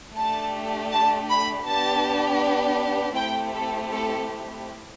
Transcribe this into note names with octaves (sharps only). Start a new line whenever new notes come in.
A3 D4 G4 A5
A5
B5
B3 D4 G4 A5
A3 C4 E4 G4 G5
A4
A4